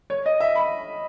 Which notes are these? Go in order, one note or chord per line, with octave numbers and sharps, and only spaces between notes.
C#5
D#5
E5
B5